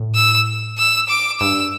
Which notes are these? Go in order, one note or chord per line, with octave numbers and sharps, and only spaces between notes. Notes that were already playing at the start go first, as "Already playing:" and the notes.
Already playing: A2
E6
E6
D6
G2 E6